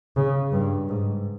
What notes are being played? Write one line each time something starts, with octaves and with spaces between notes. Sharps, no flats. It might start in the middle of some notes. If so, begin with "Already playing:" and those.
C#3
G2
G#2